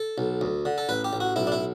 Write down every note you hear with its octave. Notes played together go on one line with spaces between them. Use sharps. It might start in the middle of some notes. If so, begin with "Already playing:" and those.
Already playing: A4
B1
D2
D3
A4
A1 B4
G4
A1
F#4
B1 E4
D4
E4